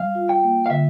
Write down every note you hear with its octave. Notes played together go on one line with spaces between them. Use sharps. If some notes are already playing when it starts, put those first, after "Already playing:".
Already playing: G3 F5
F4
G5
A#3
F5
D3 E5